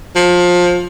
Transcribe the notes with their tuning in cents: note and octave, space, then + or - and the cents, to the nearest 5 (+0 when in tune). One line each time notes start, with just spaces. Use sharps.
F3 +20